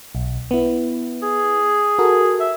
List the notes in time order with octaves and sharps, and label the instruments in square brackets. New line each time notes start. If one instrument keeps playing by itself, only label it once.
[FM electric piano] B1
B3 E4
[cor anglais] G#4
[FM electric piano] F#4 A4 A#4
[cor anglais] E5